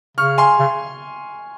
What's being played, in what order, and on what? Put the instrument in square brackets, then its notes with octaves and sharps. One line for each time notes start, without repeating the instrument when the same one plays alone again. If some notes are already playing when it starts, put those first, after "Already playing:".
[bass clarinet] C#3 [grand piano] C#6 F6
[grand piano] G#5 C6
[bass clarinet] C#3